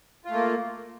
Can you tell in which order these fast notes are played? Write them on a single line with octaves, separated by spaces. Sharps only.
F4 A3 A#3